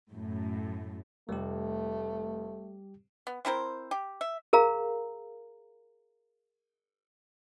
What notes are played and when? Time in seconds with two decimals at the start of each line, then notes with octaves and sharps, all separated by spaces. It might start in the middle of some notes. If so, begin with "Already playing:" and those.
0.12 F#2 A2
1.29 F1 G3 A3 G4
3.27 B3
3.45 C4 E4 A#4 C5
3.91 G4
4.21 E5
4.53 G#4 A#4 F5 A#5